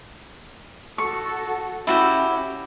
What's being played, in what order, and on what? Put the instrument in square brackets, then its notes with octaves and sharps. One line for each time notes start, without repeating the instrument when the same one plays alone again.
[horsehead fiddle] F#4 A4 [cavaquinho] C#6
[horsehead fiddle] C#4 [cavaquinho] E4 F#4 G4